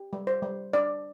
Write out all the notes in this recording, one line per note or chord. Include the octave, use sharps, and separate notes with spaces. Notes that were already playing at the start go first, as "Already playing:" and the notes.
Already playing: G4
G3
C5
G3
D4 D5